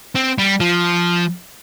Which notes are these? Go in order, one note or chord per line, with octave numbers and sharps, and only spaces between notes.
C4
G3
F3